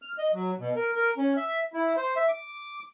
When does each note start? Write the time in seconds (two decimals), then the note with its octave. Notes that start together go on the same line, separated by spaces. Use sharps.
0.02 F6
0.18 D#5
0.34 F#3
0.59 B2
0.76 A#4
0.95 A#4
1.18 C#4
1.37 E5
1.73 E4
1.97 C5
2.16 E5
2.28 D6